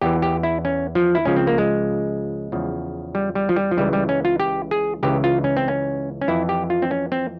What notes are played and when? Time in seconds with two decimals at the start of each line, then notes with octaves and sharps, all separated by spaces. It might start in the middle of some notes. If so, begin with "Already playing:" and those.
0.01 E2 E3 G4
0.22 G4
0.43 E4
0.65 C#4
0.95 F3
1.15 E4
1.25 C#2 C#3 F3 C#4
1.36 C4
1.47 A#3
1.58 G#3
2.52 E2 C#3 F3
3.15 G3
3.35 G3
3.49 F3
3.56 G3
3.71 F3
3.77 C#2 C#3 E3 G3
3.93 G3
4.09 C#4
4.25 F4
4.40 G4
4.71 G#4
5.03 C#2 C#3 E3 G4
5.24 F4
5.44 C#4
5.57 C4
5.68 C#4
6.21 C#4
6.28 F2 E3 E4
6.49 G4
6.70 F4
6.82 C4
6.91 C#4
7.12 C4